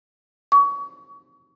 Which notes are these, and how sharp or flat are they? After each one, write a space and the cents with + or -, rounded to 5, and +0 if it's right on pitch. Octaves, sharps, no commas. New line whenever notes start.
C#6 +30